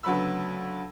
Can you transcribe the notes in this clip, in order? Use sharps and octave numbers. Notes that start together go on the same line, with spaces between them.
D2 C#3 F#3 B3 B5 E6